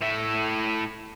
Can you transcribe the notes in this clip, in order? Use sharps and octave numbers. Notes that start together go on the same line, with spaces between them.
A2 E5